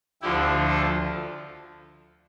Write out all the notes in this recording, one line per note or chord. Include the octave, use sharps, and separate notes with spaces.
D2 D3 F3 E4 G4
F4 A4